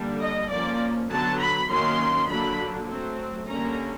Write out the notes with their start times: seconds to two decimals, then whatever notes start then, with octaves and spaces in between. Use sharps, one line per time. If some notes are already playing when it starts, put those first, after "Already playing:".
Already playing: D3 G3 A#3 D4
0.19 D#5
0.49 F3 A#3 C#4 D5
1.09 D3 F#3 B3 A5
1.38 B5
1.68 D#3 F#3 A#3 C#4 C6
2.27 D3 F#3 A#3 D4 B5
2.87 F#3 A3 C4
3.47 D3 G3 A#3 C#4 A#5